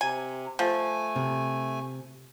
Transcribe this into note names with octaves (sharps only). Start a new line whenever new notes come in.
C3 G#5
F3 A3 G#5
C3